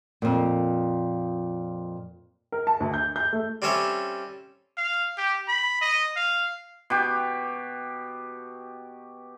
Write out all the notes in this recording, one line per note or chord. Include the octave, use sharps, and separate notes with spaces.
F2 A#2
A#4
A5
D2
G6
G6
A3
G3 C4 C#4 A4 C#5 E5
F5
G4
B5
D#5
F5
B2 G4